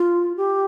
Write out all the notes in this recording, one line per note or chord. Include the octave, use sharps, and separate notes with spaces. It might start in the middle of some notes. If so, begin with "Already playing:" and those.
Already playing: F4
G4